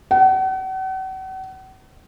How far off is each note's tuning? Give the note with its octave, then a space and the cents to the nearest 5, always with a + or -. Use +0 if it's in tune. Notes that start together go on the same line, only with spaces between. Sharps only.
F#5 +40